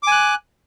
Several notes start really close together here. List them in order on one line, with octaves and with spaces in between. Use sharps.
D6 G#5 F#6